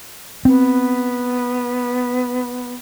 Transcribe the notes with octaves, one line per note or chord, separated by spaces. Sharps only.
B3 C4